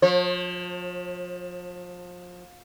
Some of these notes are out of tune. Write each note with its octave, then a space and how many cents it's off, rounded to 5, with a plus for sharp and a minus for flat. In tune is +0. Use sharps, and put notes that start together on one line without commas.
F3 +30 C#5 -40